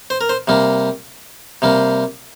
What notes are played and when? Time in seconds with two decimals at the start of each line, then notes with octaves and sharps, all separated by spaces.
0.10 C5
0.21 A#4
0.29 C5
0.48 C3 G3 A#3
1.62 C3 G3 A#3